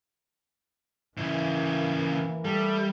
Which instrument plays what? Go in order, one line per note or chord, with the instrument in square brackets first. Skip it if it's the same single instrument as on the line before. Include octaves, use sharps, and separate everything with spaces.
[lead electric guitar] C#3 E4 [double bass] E3 A#3
[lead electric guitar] G3 [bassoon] A3